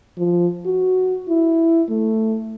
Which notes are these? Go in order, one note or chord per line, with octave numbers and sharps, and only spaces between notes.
F3
F#4
E4
A3